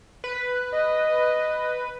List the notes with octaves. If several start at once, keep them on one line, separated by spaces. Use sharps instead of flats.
B4
D#5